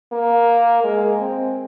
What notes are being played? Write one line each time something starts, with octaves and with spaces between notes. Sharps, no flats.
A#3
G#3
C4